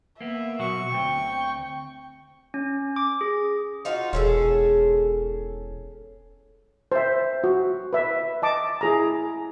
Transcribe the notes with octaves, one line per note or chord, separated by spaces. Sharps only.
A#3 B3 E5
B2 F#3 F#4 C#6
D2 C4 G5
C#4
D6
G#4
D#4 F4 F#4
E1 C#4 G#4 A4
C5 E5
F#4
B4 E5
D#5 A5 D6
E4 G#4 A#5